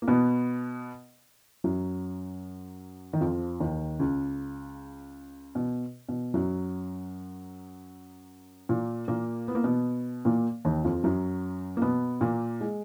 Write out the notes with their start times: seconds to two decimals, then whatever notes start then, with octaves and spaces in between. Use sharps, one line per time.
0.02 A#3
0.08 B2 B3
1.64 F#2 F#3
3.13 D#3
3.21 F2 F3
3.60 D#2 D#3
3.99 C#2 C#3
5.55 B2
6.09 B2
6.34 F#2 F#3
8.69 A#2 A#3
9.08 A#2 A#3
9.48 B3
9.55 A#3
9.64 B2 B3
10.25 A#2 A#3
10.65 D#2 D#3
10.84 F2 F3
11.04 F#2 F#3
11.77 A#3
11.82 B2 B3
12.21 A#2 A#3
12.61 G#3